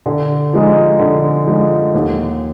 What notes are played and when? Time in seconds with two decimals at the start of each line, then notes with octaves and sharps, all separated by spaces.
0.06 D3
0.53 F3 G#3 D#4
0.99 D3
1.46 F3 G#3 D#4
1.94 D#2